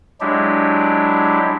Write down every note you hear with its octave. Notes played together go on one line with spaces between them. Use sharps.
F#3 G#3 D4 E4 G4